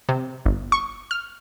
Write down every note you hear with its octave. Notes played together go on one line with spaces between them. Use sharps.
C3
G1
C#6
F6